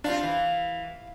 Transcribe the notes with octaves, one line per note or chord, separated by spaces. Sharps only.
G3 C4 D4 F4 F5
E3